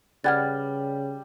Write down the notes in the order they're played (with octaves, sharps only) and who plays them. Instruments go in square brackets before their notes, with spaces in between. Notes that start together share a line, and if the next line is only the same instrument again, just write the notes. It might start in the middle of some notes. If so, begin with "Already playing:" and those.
[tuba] C#3 [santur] G3 [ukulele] B4 D5 F#5 [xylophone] F6 G#6 A6